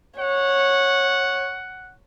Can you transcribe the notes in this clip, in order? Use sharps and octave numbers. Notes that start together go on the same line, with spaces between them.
C#5 F#5